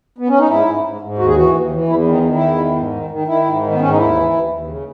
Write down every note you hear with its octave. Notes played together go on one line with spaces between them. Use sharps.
B3
C#4
D#4
G#2 E4
G#2
G#2
G#2
D#2 F#4
G#4
E3 F#4
D#2
E3
E2 E4
D#3
D#4
D#3
E4
E2
D#3
G#2
D#3
D#3
D#3 E4
G#2
D#3
B3
G#2 C#4
D#4
D#2 E4
E3
D#2
D#2
C#3